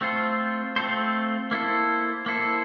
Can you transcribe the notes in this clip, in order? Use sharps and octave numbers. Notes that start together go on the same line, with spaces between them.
A3 C4 F4 A4 C5
A3 C4 F4 A4 C5
A#3 E4 A4 C5
A#3 E4 A4 C5